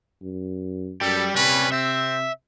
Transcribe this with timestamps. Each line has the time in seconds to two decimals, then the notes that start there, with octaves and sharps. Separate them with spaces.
0.22 F#2
1.01 F#2 G3 G4 A4
1.35 C3 G3 C#4 B4
1.72 C4 E5